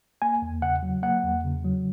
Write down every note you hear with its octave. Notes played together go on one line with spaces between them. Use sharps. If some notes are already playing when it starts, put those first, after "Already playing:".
A#3 G#5
E2
C#3 F#5
F#3
A#3 F#5
E2
C#3
F#3